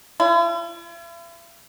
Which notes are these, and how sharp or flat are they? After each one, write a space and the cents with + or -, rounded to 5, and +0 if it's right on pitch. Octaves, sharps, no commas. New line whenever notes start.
E4 +45